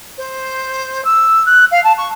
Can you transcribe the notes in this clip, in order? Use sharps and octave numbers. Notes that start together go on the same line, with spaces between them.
C5
E6
F#6
F5
A5
C#6